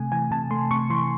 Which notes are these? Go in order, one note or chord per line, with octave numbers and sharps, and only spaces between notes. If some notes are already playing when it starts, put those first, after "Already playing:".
Already playing: C3 A3 G#5
E3 G#5
C3 A5
A3 C6
C3 C#6
E3 C6